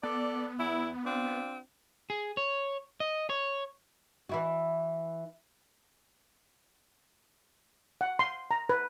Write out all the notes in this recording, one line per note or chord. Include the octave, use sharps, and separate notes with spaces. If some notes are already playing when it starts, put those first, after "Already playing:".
B3 A4 D5
E2 E4
C4 D4 F4
G#4
C#5
D#5
C#5
E3 E4 F#4
F#5
C6
A#5
B4